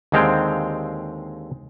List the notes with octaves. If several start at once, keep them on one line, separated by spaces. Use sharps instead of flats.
D#2 D3 G#3 C4 F5 G5